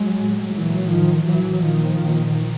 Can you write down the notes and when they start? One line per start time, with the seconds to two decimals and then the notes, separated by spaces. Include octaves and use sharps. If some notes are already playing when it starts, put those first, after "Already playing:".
Already playing: F#3 G#3
0.15 A2
0.52 A#2 E3 F#3
0.90 A2 D#3 F3
1.28 A2 E3 F#3
1.64 A#2 D#3 F3
2.02 A#2